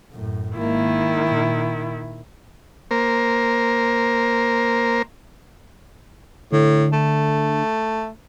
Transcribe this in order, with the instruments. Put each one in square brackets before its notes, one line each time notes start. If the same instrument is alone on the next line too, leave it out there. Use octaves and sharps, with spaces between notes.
[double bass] F#2 A2
[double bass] G#1 A#3 [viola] D#3 E4
[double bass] A#2
[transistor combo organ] A#3 A#4 C5
[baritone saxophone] A2 [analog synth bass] D3
[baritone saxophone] A3